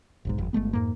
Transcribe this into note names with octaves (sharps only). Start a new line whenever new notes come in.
F1 B1 G#2
G1 F2
G1 G#3 A3 B3
F2 G#2 A#3